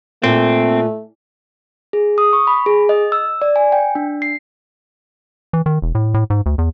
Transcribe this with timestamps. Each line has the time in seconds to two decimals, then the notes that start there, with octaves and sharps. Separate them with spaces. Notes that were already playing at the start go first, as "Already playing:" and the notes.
0.24 A#2 A3 C4
1.93 G#4
2.18 D#6
2.33 C#6
2.47 B5
2.66 G#4
2.89 D#5
3.12 E6
3.42 D5
3.56 G#5
3.72 G5
3.95 D4
4.22 C7
5.53 E3
5.66 D#3
5.82 E1
5.95 A2
6.14 A2
6.30 G#2
6.46 D2
6.58 E2